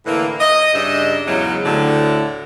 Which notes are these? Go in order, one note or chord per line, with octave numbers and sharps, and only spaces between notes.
A2 D3 E3 A#3
D#5
G2 C#3 D4 D#4 D#5 E5
E2 G#2 C#3 F#3
D2 A2 D3